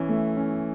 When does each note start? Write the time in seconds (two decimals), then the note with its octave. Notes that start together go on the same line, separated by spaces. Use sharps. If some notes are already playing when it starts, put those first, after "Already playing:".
Already playing: E3 C#4
0.09 A3
0.36 C#4